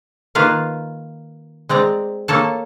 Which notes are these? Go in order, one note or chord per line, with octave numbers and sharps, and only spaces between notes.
D#3 A#3 F4 B4 F5
G#3 C4 D5 A#5
A#3 A4 C#5 A5